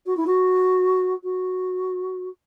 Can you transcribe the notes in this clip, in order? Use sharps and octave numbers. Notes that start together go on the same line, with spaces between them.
F#4
E4
F#4
F#4